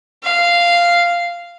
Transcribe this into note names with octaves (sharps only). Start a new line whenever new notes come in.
F5